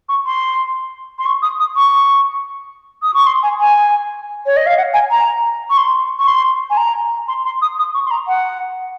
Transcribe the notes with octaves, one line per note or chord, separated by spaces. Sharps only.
C#6
C6
C6
C#6
D#6
D#6
C#6
D#6
C#6
C6
G#5
G#5
C#5
D#5
F5
F#5
G#5
A#5
C#6
C6
C#6
C6
G#5
A#5
C6
C6
D#6
D#6
C#6
C6
A#5
F#5